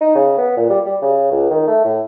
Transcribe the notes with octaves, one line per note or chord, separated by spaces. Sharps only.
D#4
C#3
B3
A#2
G3
G3
C#3
C#2
D#3
A3
A2